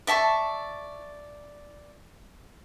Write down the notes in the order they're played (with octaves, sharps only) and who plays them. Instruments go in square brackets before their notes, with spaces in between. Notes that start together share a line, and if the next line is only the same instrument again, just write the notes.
[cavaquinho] D5 E5 A5 C#6